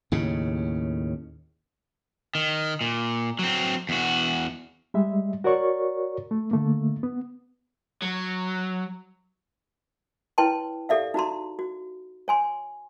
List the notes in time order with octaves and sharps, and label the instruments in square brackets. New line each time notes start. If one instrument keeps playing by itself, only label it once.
[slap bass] D#2 A2 C#3
[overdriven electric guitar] D#3
A#2
F#3 C4
E2 F#4
[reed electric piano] G3 G#3 E5
F#4 A#4 C#5 D5 C#6
A3
D3 A3 A#3
B3
[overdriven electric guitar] F#3
[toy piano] E4 B4 C#5 G5 A5 C6
G4 A4 D5 E5 F5
D#4 F#4 A#5 C6
F#4
C#5 G#5 C6